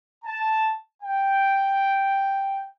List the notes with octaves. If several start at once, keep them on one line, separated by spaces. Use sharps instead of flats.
A5
G5